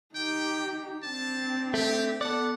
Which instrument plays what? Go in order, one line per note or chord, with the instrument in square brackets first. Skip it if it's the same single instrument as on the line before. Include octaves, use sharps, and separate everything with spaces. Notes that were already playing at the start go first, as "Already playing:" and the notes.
[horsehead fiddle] D#4 G4 [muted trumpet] G5
[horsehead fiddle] C4 D4 [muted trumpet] A5
[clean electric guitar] A3 [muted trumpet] G4
[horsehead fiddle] B3 [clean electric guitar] A4 D5 [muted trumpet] F#5